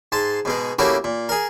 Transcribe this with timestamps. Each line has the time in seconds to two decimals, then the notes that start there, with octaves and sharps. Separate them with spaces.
0.12 G#2 A5 C6
0.45 G#2 B2 G#3
0.79 C#3 A3 A#3 E4 F#4 G4
1.04 A#2
1.29 G#4 A#4